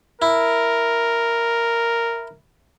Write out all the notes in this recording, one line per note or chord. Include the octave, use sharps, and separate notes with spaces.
E4 A#4